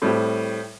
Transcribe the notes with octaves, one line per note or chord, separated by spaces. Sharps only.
A2 G3 C4 G4